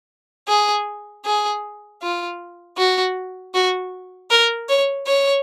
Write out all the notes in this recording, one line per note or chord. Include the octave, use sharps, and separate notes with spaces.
G#4
G#4
F4
F#4
F#4
A#4
C#5
C#5